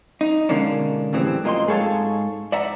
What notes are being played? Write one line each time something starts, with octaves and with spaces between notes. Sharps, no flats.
D#4
B2 D3 G#3 A#3 C#4 D4
A2 C#3 E3 G3 C4
F#2 A#3 F4 D#5 G5 C6
G#2 G#4 A4 C#5 F5 A5
D5 E5 F#5 A#5